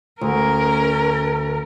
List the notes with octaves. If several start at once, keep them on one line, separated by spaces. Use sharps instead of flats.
D2 C#4 A#4